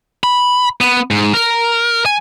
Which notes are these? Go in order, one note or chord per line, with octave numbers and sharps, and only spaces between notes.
B5
B3
G#2
A#4
G#5